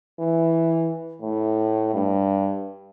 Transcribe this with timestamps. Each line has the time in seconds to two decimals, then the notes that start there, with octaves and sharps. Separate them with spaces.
0.19 E3
1.22 A2
1.94 G2